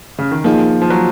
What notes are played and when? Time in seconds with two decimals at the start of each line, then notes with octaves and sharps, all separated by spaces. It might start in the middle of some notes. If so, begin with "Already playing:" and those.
0.19 C#3
0.31 D#3
0.44 F3 A#3 D#4 G#4
0.82 F3
0.90 F#3